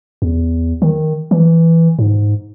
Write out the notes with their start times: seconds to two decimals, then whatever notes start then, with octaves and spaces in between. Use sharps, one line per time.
0.22 E2
0.82 D#3
1.31 E3
1.99 G#2